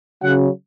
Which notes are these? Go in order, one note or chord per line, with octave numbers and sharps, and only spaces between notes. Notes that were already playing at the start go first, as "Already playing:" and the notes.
C#3 F#3 F#5